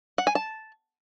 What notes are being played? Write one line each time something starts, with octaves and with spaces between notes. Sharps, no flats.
F#5
G#5
A5